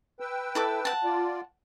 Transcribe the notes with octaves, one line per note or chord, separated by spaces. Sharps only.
B4 G5 E6
E4 A4 D6
F#5 A5
F4 D5